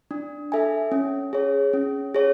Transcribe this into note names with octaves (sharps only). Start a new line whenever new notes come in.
D4
A4 E5 G#5
C#4
G#4 C#5
C#4
G#4 C#5